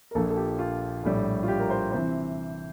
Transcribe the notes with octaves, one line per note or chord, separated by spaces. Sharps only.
A#4
A#1 A#2 F3 A4
A4
G4
F4
A#1 A2 G3
F4
G4
A#4
C5
C3 E3 C5